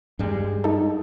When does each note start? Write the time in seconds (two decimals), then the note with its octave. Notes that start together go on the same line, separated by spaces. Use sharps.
0.19 G2 G3 G#3
0.64 D#4 A4